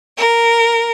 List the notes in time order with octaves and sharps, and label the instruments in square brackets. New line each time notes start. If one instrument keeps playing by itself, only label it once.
[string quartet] A#4